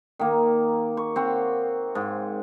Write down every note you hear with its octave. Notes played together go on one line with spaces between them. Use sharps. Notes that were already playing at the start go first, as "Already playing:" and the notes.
D#3 A#3
C#6
C4 C#5 F#5
G#2